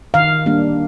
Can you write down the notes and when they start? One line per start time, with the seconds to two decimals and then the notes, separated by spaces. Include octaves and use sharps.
0.14 D#3 F5
0.46 G3 A#3 D4